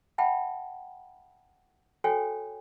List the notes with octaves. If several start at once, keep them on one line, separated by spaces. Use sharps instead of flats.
E5 F#5 G5 A5 B5
F#4 A4 C5 C#5 G5 G#5